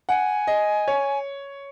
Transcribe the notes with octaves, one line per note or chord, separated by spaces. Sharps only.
F#5 G#5
D#5
C#5